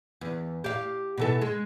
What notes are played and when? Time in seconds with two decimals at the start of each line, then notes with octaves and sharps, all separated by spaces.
0.21 E2
0.64 G4 F5
1.18 B2 E3 A4
1.41 G#3